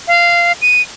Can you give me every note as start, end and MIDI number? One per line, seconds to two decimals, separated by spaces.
0.08 0.52 77
0.62 0.82 99